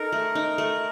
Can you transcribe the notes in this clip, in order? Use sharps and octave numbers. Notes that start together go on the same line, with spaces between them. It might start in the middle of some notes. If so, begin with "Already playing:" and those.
Already playing: D#4 A4 A#4
A3
D#4
A3